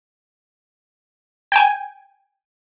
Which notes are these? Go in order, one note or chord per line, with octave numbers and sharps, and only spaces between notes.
G5 G#5